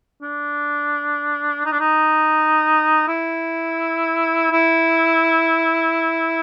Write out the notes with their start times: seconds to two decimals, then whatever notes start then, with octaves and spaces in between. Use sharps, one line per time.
0.22 D4
1.65 D#4
1.72 D4
1.80 D#4
3.08 E4
4.51 E4